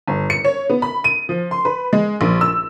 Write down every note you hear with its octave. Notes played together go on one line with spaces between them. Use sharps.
G1
C#7
C#5
B3
B5
D#7
F3
C6
B4
G#3
A#1
E6